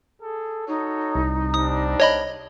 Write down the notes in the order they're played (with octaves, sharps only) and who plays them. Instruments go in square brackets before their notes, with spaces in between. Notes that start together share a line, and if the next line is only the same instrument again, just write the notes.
[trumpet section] G#4 A4
[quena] D#4 [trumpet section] F#4 A4 C#5
[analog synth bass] C2
[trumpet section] G3 D4 C5 [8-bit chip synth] D#6
[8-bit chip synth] C#5 D#5 B5